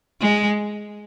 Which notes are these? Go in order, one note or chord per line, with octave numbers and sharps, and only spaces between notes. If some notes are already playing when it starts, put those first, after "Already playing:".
G#3